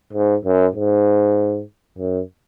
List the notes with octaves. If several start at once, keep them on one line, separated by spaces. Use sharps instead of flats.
G#2
F#2
G#2
F#2